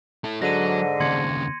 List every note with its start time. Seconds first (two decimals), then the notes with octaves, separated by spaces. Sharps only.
0.24 E4 A4
0.42 G#2 D3 F#3 A#6 D#7
1.00 D#2 C#3 C6 G#6 C#7